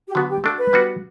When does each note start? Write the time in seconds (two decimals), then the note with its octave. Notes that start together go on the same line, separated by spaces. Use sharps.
0.08 G4
0.14 D3 F#3 B3 F#4
0.29 G4
0.44 A3 D4 F#4 A4
0.58 B4
0.73 G3 B3 D4 F#4